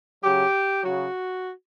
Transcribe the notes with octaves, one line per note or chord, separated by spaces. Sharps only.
C#3 F#3 G4
C#3 F#3 F#4